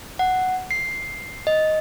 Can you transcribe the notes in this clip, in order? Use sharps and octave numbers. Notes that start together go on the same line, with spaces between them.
F#5
C7
D#5